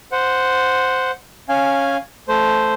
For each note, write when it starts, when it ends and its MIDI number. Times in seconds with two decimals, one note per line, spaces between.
0.12 1.11 72
0.12 1.11 78
1.49 1.97 61
1.49 1.97 77
1.49 1.97 80
2.28 2.74 57
2.28 2.74 72